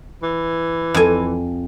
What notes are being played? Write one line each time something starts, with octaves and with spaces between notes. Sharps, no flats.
E3
F2 G#5